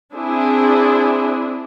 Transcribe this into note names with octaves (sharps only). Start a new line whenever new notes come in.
C4 D4 E4 G#4